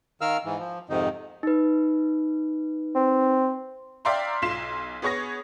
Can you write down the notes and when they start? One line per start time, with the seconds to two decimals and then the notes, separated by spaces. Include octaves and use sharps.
0.21 D#3 A#4 F5 E6 F6
0.45 G#2 E3
0.59 F3
0.89 F2 G#2 C3 D#3 D#4
1.43 D#4 B4
2.95 C4
4.05 D5 E5 F5 G5 A#5 C6
4.42 B1 F4 C6 B6 E7
5.02 B3 G#4 C#5 C#6 A#6